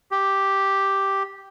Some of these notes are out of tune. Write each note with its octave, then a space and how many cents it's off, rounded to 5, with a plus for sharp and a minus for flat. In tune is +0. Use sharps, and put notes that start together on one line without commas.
G4 +0